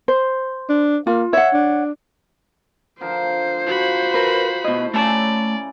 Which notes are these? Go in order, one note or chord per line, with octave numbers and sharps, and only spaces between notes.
C5
D4
A#3 F4
C#5 E5 F#5
D4
D3 F3 A#4 C5
F3 F#4 B5
A#4 B4
B2 A3 E4 D#5
C#3 A3 C#4 D5 A5 A#5